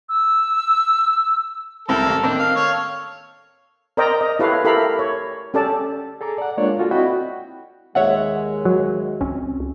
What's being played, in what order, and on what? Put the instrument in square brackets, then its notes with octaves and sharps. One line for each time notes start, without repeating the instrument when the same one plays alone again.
[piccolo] E6
[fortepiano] C2 C4 E4 [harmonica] A4 A#4
[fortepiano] A1
[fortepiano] D#3 A#3 C4 [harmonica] D4
[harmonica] F5
A4 C#5 F5
[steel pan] A#4 C5 D5 D#5 G5 A#5
D#5
E4 G4 A4 B4 C#5 F5
E4 G4 A4 A#4 F5 B5
C#5
C#4 G4 A4 D5 A5
[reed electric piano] G#4 A4 A#5 D6
D5 F#5
G#3 A#3 D4 F4 C#5 D5
F4 F#4 A4
C4 E4 F#4 D#5 G5 B5
[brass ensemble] D#2 G#3 [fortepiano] C#5 E5 F#5
[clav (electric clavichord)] F#3
[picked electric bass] C#2 C4 C#4